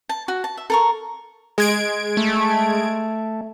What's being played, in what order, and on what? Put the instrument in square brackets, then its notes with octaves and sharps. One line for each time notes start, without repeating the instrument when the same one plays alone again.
[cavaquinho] A5
F#4
A5
E5
A4 A#4 C#6
[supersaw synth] G#3 G#6 D7
[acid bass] A3